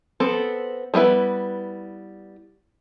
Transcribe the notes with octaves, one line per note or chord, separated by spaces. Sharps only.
B3 C4 A4
G3 B3 E4 B4